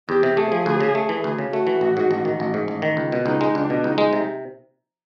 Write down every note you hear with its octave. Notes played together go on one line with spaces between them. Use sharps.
E2 G4
C3
A3 G#4
F3
D2
C#3
A3
E3
D2
C#3
A3 F#4
E3
A1
G#2
A1
D#3
A1
G#2
A1
D#3
C#2
B2
C#2 D#4
G#3
C#2 D4
B2
C#2 D#4
G#3
C3